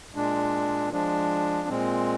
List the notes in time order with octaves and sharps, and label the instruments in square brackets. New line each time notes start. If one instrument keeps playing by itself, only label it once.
[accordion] A#2 G#3 D4
F3 G#3 D4
A#2 G#3 C4